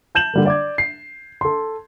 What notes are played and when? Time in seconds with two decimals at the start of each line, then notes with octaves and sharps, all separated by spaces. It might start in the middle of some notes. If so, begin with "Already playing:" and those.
0.15 A5 G6 E7 F#7
0.34 D3 G3 A#3
0.46 D5 D6 G#6
0.78 C7
1.41 A4 C6